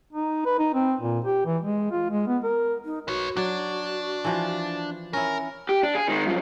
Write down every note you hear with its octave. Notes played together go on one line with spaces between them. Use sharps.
D#4
B4
D#4
C4
A#2
G4
E3
G#3
F4
G#3
B3
A#4
D#4
F#4 B4 C#5
F#3 D4 D5
E3 F3 F4
C#4 E4 A#4
G4
D4
G#4
D#3 G#3
F#2 F3